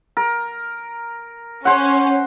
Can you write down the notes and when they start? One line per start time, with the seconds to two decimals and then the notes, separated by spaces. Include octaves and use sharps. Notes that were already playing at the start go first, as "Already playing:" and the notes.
0.17 A#4
1.65 C#4 C5 F#5